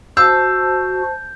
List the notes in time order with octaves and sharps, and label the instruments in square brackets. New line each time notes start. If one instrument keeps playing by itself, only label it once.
[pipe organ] F#4 [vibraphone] C5 A5 [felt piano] E6 [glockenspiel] G6